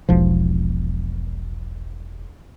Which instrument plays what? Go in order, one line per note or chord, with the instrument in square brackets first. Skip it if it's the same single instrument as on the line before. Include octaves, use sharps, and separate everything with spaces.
[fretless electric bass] E1 B1 F3